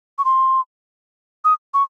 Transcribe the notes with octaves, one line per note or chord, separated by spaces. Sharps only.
C#6
C6
D#6
C#6